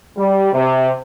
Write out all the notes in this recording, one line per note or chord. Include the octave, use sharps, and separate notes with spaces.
G3
C3